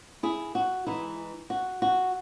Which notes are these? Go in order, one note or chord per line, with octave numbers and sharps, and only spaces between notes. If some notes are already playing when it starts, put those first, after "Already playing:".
E4 G#4
F#4
E3 G#3 D#4 E4
F#4
F#4